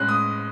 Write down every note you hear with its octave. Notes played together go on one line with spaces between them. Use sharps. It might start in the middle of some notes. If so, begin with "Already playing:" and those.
Already playing: A2 G#3 C#4 F#6
D#6